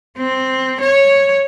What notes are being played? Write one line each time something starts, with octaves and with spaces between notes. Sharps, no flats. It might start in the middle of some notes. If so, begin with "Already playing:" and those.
C4
C#5